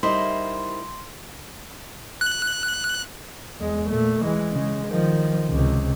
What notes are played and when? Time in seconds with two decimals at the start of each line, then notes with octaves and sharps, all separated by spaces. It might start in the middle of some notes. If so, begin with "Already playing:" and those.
0.03 G3 D#4 E4 A#4 C5 D#5 C6
2.21 F#6
3.60 E2 G#3
3.89 A#2 A3
4.22 E3 G#3
4.52 C#3 G#3
4.87 D#3 F3
5.50 C#2 C3